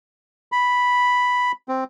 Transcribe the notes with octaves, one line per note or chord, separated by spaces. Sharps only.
B5
C4